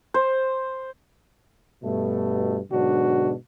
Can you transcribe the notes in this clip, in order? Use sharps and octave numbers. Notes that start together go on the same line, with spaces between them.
C5
G2 B2 A3
G#2 B2 D3 F#3 D4 F#4